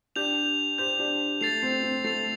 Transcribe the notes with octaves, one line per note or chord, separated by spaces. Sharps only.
D4 G4 G6 F7
G4 C5 G6 F7
D4 G4
A3 A6 C7 F7
C4
C4
A3 A6 C7 F7